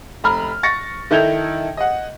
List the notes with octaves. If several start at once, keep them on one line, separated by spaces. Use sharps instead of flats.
F1 A#5 B5 F6
C#6 A6 A#6 C#7
D#3 E4 A4 G6 G#6 F7
D#5 F#5